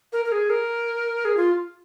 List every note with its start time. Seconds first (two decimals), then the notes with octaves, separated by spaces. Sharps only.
0.13 A#4
0.25 A#4
0.32 G#4
0.50 A#4
1.25 G#4
1.37 F4